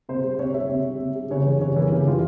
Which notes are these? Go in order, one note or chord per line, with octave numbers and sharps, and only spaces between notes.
C3 C5
G3
C3 C#5
G3 E5
C3
G3
C3
G3
C#3 C#5
E3 G3
C#3 C#5
E3 G3 A#4
C#3 G4
E3 G3 F4